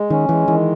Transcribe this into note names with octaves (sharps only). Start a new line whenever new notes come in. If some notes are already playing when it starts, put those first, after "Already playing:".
Already playing: G#3
D#3 C#4
E3 G#3
D#3 E3